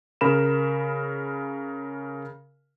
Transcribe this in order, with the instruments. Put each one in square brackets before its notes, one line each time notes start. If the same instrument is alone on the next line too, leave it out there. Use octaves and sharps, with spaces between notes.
[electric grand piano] C#3 A#4 B5 E7